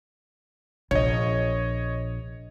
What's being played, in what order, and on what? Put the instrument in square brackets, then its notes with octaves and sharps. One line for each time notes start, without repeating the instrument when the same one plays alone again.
[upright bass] A#1 [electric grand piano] C#5 D#5